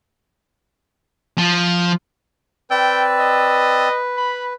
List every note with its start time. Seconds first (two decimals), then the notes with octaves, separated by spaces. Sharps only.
1.38 F3
2.71 C4 B4 D5 G5 E6
3.19 D#5
4.17 B5